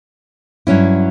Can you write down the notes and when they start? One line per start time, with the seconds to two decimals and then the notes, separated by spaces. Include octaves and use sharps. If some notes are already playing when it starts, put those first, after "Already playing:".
0.67 G2 F#3 C#4 E4